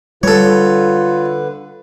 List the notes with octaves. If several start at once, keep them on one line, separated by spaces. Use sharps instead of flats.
D3 G3 F4 A4 B4 C#5